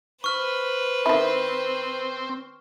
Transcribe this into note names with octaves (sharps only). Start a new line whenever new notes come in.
B4 C5 C#6 F6
D#3 C4 E4